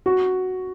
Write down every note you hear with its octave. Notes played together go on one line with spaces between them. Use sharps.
F#4